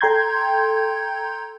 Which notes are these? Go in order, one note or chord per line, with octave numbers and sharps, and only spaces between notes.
A4 G5 A#5 C6 G6 G#6